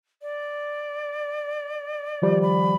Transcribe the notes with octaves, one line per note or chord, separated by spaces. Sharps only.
D5
D#3 F3 G3
B5